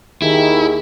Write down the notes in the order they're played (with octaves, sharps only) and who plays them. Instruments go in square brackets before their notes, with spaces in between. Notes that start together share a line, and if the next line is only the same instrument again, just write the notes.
[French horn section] D#2 G4 G#4 [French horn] D#3 [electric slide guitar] E4